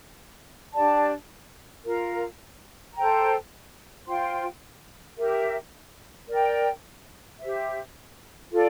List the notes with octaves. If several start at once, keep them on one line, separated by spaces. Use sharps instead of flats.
D4 G4 D5 A5
F4 A#4 F5 A#5
A4 C5 G5 A#5
F4 C5 G5 C6
G4 A#4 E5
A#4 D5 G5
G4 C5 E5
F4 A4 D5